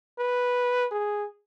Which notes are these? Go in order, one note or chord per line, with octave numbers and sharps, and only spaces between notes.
B4
G#4